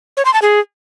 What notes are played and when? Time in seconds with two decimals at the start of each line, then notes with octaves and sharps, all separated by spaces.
0.17 C#5
0.25 C6
0.34 A5
0.42 G#4